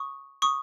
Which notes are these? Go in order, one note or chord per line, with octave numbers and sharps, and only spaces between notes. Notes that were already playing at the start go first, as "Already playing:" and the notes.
Already playing: C#6 D#6
C#6 D#6